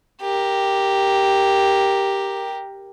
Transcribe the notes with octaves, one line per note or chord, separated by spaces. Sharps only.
G4 A#4